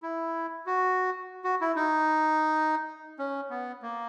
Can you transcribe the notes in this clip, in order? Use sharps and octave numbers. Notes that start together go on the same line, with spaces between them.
E4
F#4
F#4
E4
D#4
C#4
B3
A#3